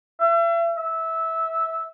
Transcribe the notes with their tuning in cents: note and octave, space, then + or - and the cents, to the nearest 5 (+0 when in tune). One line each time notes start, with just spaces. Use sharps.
E5 +40
E5 -15